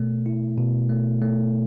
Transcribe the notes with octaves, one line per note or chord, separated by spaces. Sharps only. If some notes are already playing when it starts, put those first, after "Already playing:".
Already playing: B2 A3
E4
B2
A3
A3